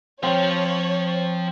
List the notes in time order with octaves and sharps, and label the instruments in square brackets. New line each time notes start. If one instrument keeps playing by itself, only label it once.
[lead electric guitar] F3 F5 [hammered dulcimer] C4 [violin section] C#5